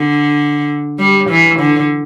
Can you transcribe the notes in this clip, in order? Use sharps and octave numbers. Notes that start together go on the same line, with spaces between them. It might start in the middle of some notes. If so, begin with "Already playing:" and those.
Already playing: D3
G3
E3
D3